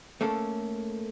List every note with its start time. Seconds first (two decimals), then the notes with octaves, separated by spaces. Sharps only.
0.21 A3 A#3 C#4 A4